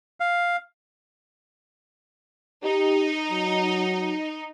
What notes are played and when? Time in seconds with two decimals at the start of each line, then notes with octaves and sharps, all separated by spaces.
0.20 F5
2.64 D#4 G4
3.31 F#3